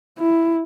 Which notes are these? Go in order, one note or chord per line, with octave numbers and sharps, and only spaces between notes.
E4